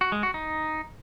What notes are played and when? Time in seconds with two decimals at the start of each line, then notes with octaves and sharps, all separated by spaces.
0.01 F#4
0.12 G#3
0.23 F#4
0.34 D#4